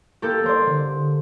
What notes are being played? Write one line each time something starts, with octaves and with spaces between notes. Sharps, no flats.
A#3 G4 A4
A#3 C5 D5
D3